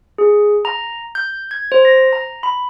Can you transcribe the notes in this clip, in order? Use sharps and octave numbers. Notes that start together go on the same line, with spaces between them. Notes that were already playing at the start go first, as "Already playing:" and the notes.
G#4
A#5
G6
G#6
C5
A#6
A#5
B5